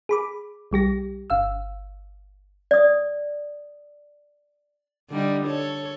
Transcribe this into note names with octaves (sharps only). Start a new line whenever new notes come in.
G#4 B5 D6
B1 G3 G4 A#6
G1 F5 E6
D5 D#6
D3 G3 D#4
A4 C#5